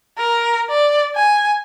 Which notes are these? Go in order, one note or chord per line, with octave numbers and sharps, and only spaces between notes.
A#4
D5
G#5